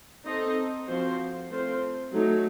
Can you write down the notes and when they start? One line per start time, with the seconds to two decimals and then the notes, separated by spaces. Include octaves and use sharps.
0.25 C4 D#4 A4 C5 D#5
0.87 F3 C4 F#4 C5
1.50 A3 C4 F4 C5
2.12 F#3 A3 D#4